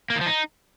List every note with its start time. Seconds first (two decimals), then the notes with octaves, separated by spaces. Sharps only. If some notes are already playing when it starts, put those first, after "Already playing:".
0.10 A#3
0.15 D#3
0.21 F3
0.26 D#4